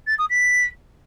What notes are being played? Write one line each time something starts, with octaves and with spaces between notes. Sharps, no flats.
A6
D#6
B6